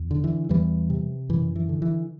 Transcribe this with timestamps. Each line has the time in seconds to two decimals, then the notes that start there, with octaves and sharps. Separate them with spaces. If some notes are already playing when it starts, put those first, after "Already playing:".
Already playing: E2
0.11 D3
0.24 E3
0.49 E2 E3 G3
0.90 C3
1.29 F#2 E3
1.56 E3
1.69 D3
1.82 E3